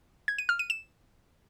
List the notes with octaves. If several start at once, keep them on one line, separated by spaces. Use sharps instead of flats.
G#6
D#7
F6
D#7
E7